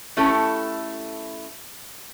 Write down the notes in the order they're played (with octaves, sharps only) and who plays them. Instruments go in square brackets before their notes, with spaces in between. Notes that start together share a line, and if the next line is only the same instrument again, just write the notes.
[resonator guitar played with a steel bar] A3 C#4 E4 G4 A4